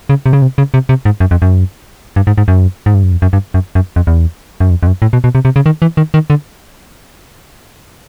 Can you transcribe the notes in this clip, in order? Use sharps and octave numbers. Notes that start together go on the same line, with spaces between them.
C#3
C3
C#3
C3
C#3
C3
C3
G#2
F#2
F2
F#2
G2
G#2
G#2
F#2
G#2
G2
F#2
F2
F#2
G2
F#2
F#2
F2
E2
F#2
F2
F2
F#2
A2
B2
B2
C3
C3
C#3
D#3
E3
D#3
D#3
D3